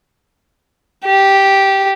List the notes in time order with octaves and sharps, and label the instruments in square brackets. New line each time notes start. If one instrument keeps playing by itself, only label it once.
[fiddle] G4